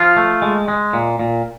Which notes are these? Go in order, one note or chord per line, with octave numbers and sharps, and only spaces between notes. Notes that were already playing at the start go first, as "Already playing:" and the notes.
Already playing: F3 F4
A3
G#3
G#3
A#2
A#2